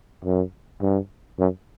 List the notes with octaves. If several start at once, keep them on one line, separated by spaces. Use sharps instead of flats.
F#2
G2
F#2